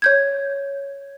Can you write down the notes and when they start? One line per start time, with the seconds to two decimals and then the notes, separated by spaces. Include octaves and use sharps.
0.02 C#5 G6 G#6